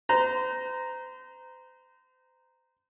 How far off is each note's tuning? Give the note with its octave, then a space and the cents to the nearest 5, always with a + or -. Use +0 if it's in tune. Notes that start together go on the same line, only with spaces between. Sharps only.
C5 -35 A#5 +0